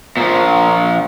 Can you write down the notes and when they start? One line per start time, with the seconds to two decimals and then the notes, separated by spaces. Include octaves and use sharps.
0.17 A#2 F3